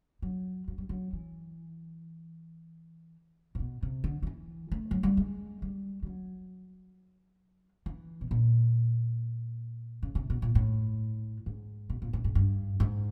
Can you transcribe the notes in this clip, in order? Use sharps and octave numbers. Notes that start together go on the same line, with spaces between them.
F#3
F#3
G3
F#3
E3
C3
B2
C3
D3
F3
E3
A3
F#3
G3
G#3
G3
G3
F#3
E3
B2
A#2
C#3
C3
B2
A#2
A2
G#2
B2
A#2
A2
G#2
G2
G#2